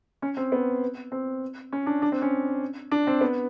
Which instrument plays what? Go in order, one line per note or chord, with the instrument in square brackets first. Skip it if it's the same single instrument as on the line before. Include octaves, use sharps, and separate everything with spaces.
[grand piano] C#4
C4
B3
C4
C#4
D4
D4
C4
C#4
D4
C4
B3